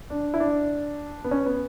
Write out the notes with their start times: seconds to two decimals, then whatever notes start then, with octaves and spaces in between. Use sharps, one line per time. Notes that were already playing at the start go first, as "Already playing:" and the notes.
0.10 D4
0.34 E4
0.40 D4
1.24 B3
1.31 C#4
1.46 B3